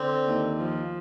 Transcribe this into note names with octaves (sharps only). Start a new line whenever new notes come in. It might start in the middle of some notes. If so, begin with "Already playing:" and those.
Already playing: D3 C4
D#2
F3